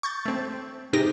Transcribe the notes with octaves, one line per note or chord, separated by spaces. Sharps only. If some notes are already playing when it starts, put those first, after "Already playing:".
C#6 G6 A6
A3 C4
G#2 C3 D#4 G4 A#6